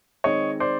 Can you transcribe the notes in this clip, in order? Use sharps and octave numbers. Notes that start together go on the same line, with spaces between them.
D#3 G#3 C4 D#4 C#5 D#5
C5 D5